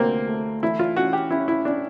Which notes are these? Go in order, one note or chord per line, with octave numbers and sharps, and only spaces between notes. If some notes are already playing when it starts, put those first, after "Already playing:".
Already playing: D2 C3 A#3 C4
A3
E3 E4
F4
C#4 F#4
G4
C#4 E4
E4
C#4 D4